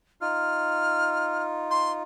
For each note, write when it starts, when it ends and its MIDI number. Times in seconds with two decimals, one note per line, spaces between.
0.21 2.03 63
0.21 2.03 65
0.21 1.44 89
1.71 1.92 84